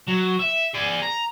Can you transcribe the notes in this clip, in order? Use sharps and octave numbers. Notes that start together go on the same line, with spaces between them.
F#3
E5
G#4 D5
A#5